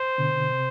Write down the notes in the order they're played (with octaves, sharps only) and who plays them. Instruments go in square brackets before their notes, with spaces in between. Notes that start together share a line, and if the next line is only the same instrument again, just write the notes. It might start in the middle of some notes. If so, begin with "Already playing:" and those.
Already playing: [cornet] C5
[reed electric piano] B2 D3
C3